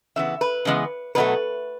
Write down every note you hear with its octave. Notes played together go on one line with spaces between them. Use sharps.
C#3 E3 B3 E5
B4
C#3 E3 G#3 B3
B2 F#3 A3 B4